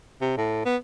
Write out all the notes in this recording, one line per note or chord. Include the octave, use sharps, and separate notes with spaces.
C3
A2
B3